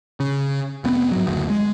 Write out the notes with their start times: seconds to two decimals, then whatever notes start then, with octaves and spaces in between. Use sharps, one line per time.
0.20 C#3
0.84 F1 B3 C4
1.12 G#2 F#3
1.27 F#1 D2
1.50 G#3